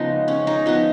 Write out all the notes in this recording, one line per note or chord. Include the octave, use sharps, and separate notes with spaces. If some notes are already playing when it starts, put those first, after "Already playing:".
Already playing: C#3 F3 G#3 B3 D#4
C#4
D#4
F3 B3 D#4